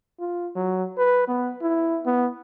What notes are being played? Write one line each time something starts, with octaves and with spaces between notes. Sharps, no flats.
F4
F#3
B4
B3
E4
B3